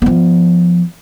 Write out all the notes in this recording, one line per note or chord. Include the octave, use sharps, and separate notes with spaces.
F3 B3